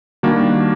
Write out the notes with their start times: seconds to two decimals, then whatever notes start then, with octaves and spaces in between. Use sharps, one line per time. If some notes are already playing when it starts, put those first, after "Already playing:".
0.23 D#3 G3 A#3 D4 F#4